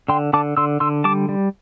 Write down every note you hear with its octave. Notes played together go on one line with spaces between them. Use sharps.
D3 G5 C6
D3 A5 D6
D3 C6 E6
D3 C6 E6
G3 A5 D6
G3